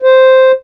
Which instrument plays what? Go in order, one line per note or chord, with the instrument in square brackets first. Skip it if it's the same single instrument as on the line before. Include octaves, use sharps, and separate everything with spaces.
[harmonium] C5